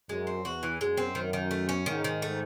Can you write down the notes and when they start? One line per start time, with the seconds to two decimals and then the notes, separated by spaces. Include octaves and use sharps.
0.09 F#2 G#3
0.27 C4
0.45 E2 F#4
0.63 E3
0.80 F#2 G#3
0.97 C4
1.15 F#2 D#3
1.33 D#3
1.51 A3
1.69 C#4
1.86 G#2 D#3
2.04 D#3
2.22 A3